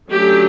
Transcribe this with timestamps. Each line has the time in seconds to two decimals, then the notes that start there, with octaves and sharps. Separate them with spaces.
0.11 D3 F#3 A3 C#4 G4